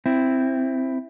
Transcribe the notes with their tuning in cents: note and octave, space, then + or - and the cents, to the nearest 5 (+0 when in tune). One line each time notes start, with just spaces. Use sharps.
C4 +0 E4 +5